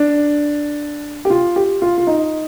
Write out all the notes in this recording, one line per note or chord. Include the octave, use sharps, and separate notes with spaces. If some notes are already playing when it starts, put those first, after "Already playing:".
Already playing: D4
G4
F4
G4
F4
F4
D#4